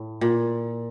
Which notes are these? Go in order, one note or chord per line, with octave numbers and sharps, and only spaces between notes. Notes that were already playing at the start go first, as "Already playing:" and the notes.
Already playing: A2
A#2